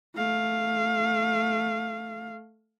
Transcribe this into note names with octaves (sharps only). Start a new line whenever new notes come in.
A3 F5